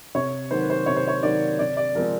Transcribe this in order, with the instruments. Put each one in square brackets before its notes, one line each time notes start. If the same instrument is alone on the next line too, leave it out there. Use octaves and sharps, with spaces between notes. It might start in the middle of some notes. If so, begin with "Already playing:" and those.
[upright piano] C3 C#5
D#3 F#3 A#3 C5
B4
C5
C3 C#5
C5
C#5
D#3 F#3 A#3 D5
C3 D5
D5
F3 G#3 C4 A#4